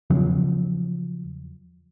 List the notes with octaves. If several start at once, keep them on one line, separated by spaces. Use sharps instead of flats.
E2 C#3 F3 F#3